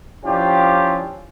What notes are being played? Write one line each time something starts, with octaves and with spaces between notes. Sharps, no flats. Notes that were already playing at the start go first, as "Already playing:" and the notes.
F3 C#4 D4 E4 F4 G4